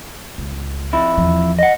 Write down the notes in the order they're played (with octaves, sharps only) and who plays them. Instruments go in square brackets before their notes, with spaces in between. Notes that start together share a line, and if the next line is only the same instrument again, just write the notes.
[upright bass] C#2
[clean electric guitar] F2 E4
[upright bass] E2 F3
[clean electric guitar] D#5 F#5